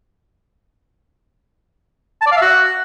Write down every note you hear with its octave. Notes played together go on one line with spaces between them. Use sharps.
A5
D5
F5
E5
F#4